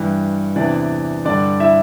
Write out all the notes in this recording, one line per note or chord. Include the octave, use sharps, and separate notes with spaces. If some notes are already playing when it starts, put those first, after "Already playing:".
Already playing: G2 E3
E2 C3 E3 D4 D5
G2 D3 D4 D5
E4 E5